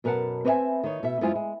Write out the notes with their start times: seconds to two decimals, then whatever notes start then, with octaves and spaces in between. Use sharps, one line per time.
0.04 F#2 B2 A#4 B4 F#5 A5
0.45 C4 B4 C#5 D#5 E5 G#5
0.83 D#3 D#4 C#5
1.03 B2 E5
1.21 F#2 G#3 E4 F4 G#4 C5
1.35 G#3